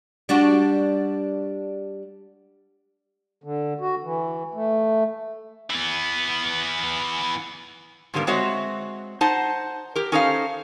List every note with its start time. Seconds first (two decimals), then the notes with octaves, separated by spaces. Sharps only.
0.29 G3 D4 F#4
3.44 D3
3.80 F#4
4.03 E3
4.54 A3
5.70 E3 B3
8.14 G#2 D3 G3 A#3 B3
8.27 G#3 C4 F#4 C#5 E5
9.21 D#4 C5 F#5 A5
9.96 G4 A#4
10.12 C#4 D#4 A4 C5 D#5 F5